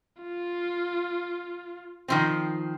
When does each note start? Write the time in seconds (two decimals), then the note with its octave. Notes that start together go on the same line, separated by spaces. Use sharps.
0.22 F4
2.08 D#3 F3 C4